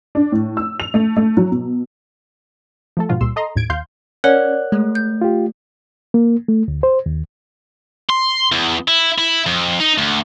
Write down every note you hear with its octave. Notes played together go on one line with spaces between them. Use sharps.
D4
A2
E6
F7
A3
A3
F#3
B2
F3 A3 A4
G#2 B2 D3 F3 F4 F#4
C#2 A#2 G3 C6 E6
A4 D#5 A#5 C6
D#2 A2 G#6 D7
D#2 F5 C6 G6
C#4 A#4 C#5 D5 F#5 F#6
G#3 A3
G6
F4 G4
A#3
A3
D2
C5
D#2
C6
E2
E4
E4
F2
D#4
D2